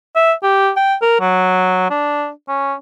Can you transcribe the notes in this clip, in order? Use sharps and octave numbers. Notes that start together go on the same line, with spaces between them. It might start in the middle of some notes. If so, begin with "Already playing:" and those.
E5
G4
G5
A#4
F#3
D4
C#4